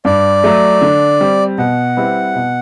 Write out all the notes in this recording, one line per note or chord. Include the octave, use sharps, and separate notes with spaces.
G2 D5
F#3 A3
D3
G3 C4
B2 F#5
G3 C4 E4 B4
B2